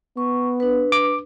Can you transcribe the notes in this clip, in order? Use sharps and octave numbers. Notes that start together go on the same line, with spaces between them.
B3 C#6
D4 B4
D6